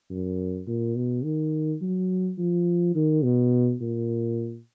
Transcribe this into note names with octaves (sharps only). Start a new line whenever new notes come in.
F#2
A#2
B2
D#3
F#3
F3
D#3
B2
A#2